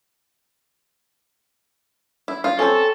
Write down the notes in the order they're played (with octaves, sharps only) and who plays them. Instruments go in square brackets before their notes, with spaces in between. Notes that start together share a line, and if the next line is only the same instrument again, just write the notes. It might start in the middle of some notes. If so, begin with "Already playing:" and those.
[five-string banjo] E4
F4
[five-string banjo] C4 C#4 [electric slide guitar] A4